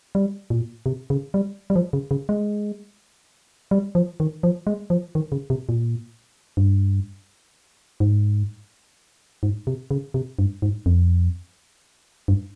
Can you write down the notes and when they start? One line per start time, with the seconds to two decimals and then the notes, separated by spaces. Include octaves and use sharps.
0.15 G3
0.50 A#2
0.86 C3
1.10 C#3
1.34 G3
1.70 G3
1.76 F3
1.93 C#3
2.11 C#3
2.29 G#3
3.71 G3
3.95 F3
4.20 D#3
4.43 F3
4.67 G#3
4.90 F3
5.15 D#3
5.32 C#3
5.50 C3
5.69 A#2
6.57 G2
8.00 G#2
9.43 G#2
9.67 C3
9.91 C#3
10.14 C3
10.39 G2
10.62 G#2
10.86 F2
12.28 G2